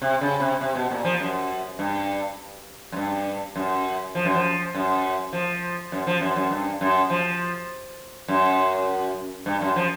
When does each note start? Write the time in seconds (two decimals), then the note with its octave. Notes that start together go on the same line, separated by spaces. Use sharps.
0.02 C3
0.21 C#3
0.40 C3
0.61 C3
0.75 B2
0.91 A#2
1.05 F3
1.20 F#2
1.79 G2
2.92 F#2
2.96 G2
3.56 F#2
4.15 F3
4.25 F#2
4.35 F3
4.74 F#2
5.33 F3
5.92 F#2
6.07 F3
6.21 F#2
6.36 F#2
6.51 G2
6.81 F#2
7.10 F3
8.28 F#2
9.46 G2
9.61 F#2
9.76 F3